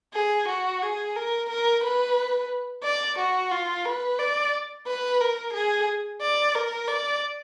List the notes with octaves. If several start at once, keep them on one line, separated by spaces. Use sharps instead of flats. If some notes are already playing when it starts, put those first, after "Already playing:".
G#4
F#4
G#4
A#4
A#4
B4
D5
F#4
F4
B4
D5
B4
A#4
G#4
D5
A#4
D5